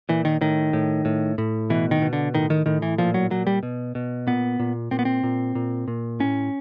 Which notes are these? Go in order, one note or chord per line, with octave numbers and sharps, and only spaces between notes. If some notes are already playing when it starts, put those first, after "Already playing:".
A#2 E3
D#3
A2 D#3
A2
A2
A2
B2 E3
D#3
B2
D3
A2 D#3
D#3
A2 D#3
E3
A#2 F3
F#3
A#2 F#3
G3
B2
B2
A#2 B3
A#2
A#2 C4
B3
C4
A#2
A#2
A#2
A2 C#4